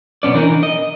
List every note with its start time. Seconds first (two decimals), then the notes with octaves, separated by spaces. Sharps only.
0.23 B1 A#2 B3 C#4 D5
0.35 E3 D4 D#4 A#4
0.63 D#5